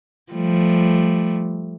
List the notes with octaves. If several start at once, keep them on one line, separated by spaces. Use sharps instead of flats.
F3 G3 A3